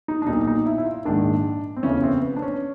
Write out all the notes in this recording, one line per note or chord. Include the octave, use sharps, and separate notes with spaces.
D#4
D4
B1 A#2 D#4
D#4
E4
E4
F4
A#1 G#2 D#3 D4
C4
F1 E2 C#3 E3 C#4
C4
B3
D4
C#4